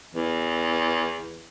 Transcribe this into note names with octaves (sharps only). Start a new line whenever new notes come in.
E2